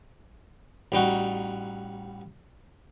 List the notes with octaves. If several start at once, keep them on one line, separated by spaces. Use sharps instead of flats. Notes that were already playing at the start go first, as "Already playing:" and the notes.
A1 G3 D#4 F#4